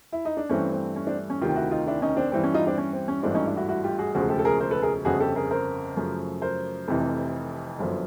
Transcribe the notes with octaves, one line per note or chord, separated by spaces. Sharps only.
E4
D#4
D4
G2 E3 A3 C4 C#4
C4
C#4
C4 D4
C#4
D2 C3 D#3 F4 G4
E4 F#4
D#4 F4
D4 E4
C#4 D#4
C4 D4
G2 E3 G3 C4
C#4
D#4 F4
C4 D4
C#4
C4
C#4
G#1 G2 E3 A3 C4 D4
C#4 D#4
D4 E4
E4 F#4
E4 F#4
F4 G4
F#4 G#4
E1 D2 C#3 F3 F#4 G#4
G4 A4
A4
G#4 A#4
A#4 C5
A4 B4
G#4 A#4
G1 F2 C#3 F#4 G#4
G4 A4
G#4 A#4
A#4 C5
F#2 C#3 F3 A3
A#4 C5
F1 F2 C3 E3
G1 F#2 D3 F3